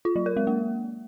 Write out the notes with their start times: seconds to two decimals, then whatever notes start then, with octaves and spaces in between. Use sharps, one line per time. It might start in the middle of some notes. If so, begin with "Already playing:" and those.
0.05 F4
0.16 F#3
0.26 A#4
0.37 G#3
0.47 A#3